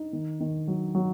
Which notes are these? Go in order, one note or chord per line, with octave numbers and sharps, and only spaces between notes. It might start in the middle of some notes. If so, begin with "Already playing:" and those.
Already playing: D#4
D#3
D#3
F#3
F#3